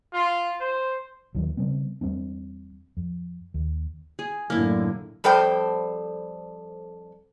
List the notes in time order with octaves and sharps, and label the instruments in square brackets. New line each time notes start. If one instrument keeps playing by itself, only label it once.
[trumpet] F4
C5
[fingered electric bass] D#2 D#3 E3 F#3
C#3 G3 B3 C4
E2 G3 C4 D4
F2
D#2
[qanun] G#4
[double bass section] F#2 A2 D3 [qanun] A#3 E4
[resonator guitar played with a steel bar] F2 G3 A4 C5 G5